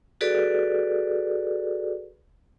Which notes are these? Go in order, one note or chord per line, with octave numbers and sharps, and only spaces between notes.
F#4 G#4 A4 B4 D5